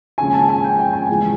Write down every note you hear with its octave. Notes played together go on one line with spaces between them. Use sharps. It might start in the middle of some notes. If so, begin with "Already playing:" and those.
D#2 C#3 F3 G#3 C#4 G#5
A5
G#5
G5
G5
G#5
E2 C#3 F3 G#3